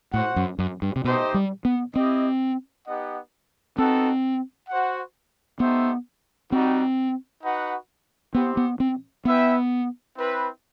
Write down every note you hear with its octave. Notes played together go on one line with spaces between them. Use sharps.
A2 F#4 C5 F#5
F#2
F#2
G2
C3
B2 A3 D#4 G4 C5 D#5
G3
B3
C4 E4 G4 D#5
B3 D#4 G4 D#5 F#5
B3 C4 D#4 F#4 A4
F#4 C5 F#5
A3 B3 D#4 G4 C5 E5
G3 C4 D#4 F#4
D#4 F#4 B4 F#5
B3 C4 E4 G4 C5
B3
C4
B3 E4 B4 E5 G5
C4 E4 B4